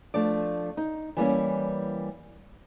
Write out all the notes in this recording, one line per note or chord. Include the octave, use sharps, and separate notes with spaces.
F3 A3 D4 D5
D#4
E3 G3 A#3 C#4